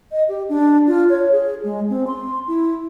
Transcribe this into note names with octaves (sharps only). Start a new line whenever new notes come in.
D#5
G4
D4
F4
C#5
G#4
G#3
C4
C6
E4